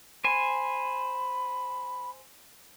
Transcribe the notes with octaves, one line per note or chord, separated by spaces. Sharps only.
C5 G#5 B5